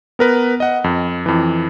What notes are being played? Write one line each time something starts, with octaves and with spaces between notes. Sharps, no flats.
B3 A#4 B4
D#5 F#5
F2
F2 E3